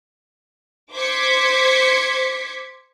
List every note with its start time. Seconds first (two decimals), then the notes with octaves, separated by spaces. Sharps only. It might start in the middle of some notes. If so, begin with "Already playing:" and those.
0.92 C5 D6 G#6 B6 C#7